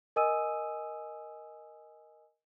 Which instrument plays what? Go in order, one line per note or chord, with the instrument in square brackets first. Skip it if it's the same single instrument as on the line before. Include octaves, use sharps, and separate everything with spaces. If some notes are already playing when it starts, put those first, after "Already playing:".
[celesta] A#4 D#5 G#5 D#6 E6 D#7